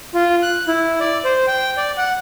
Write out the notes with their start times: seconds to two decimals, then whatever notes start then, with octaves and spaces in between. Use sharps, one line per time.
0.14 F4
0.42 F#6
0.68 E4
1.00 D5
1.25 C5
1.47 G5
1.77 D5
1.97 F#5